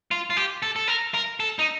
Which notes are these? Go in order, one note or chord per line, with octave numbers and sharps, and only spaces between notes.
F4
F4
G4
A4
A4
A#4
A#4
A4
D#4